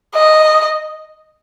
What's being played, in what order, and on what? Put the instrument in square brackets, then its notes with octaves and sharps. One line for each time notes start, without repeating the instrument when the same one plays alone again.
[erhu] D#5